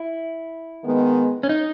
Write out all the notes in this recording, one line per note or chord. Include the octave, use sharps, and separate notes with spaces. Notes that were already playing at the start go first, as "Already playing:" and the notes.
Already playing: E4
D#3 G#3 B3
C#4
D#4